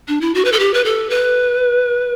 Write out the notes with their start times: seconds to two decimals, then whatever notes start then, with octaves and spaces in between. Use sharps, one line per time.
0.08 D4
0.21 E4
0.34 F#4
0.45 B4
0.52 A4
0.59 G4
0.74 B4
0.85 A4
1.10 B4